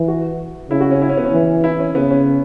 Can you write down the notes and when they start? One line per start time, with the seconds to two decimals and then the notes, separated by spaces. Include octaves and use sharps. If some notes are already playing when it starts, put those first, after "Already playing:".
Already playing: E3
0.08 F#4
0.70 C#3 E4
0.80 F#4
0.91 C#4
1.02 E4
1.09 C#4
1.17 B3
1.25 C#4
1.32 E3
1.64 E4
1.79 C#4
1.95 C#3 B3
2.10 C#4